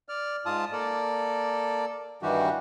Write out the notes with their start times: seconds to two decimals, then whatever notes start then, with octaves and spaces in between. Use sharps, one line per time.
0.09 D5 F6
0.46 G#2 F4 A5 D#6
0.72 A#3 A4 D5
2.22 G2 D#3 E3 G3 F#4 G4